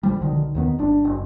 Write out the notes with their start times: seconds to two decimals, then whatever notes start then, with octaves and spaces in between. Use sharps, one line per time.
0.03 A1 F3 G3
0.20 B1 D3 D#3
0.55 D#2 D#3 B3
0.79 G1 D4
1.05 F#1